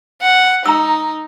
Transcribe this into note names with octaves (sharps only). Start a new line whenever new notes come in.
F#5
D#4 A#5 E6